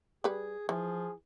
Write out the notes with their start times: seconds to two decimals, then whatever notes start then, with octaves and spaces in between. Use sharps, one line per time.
0.24 G3 G#4 B4
0.69 E3 F3 G#4